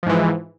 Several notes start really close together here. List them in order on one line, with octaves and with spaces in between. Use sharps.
F3 G#2 E3